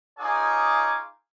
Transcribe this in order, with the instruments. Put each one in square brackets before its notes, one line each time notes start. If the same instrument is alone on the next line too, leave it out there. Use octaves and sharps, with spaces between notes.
[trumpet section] D#4 F4 G#4 C#5 G#5 D6